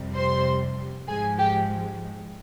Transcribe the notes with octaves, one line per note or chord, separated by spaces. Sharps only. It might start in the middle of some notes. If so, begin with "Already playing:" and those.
Already playing: F2 C3 G3
C5 C6
G#2 F3 G#3 G#4 G#5
G4 G5